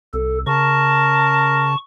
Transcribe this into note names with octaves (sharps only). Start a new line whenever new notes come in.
C2 A4
C#3 A#4 A5 C#6